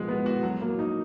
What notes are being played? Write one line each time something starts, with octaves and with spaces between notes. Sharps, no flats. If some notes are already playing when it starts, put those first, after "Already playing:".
Already playing: B2 F3 G#3
B3
F#4
F#3
A#3
D#4